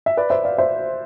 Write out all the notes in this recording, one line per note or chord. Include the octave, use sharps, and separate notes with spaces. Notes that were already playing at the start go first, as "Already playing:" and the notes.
E5
B4 D5
C5 E5
D5 F5
C5 E5